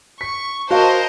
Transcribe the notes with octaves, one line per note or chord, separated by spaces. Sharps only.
C#6 B6
F#4 A#4 C5 C#5 D#5 F5 A5